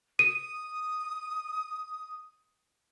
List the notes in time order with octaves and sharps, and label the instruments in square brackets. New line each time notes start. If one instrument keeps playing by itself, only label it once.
[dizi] D#6 [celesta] D#7